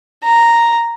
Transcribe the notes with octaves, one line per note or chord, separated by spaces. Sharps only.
A#5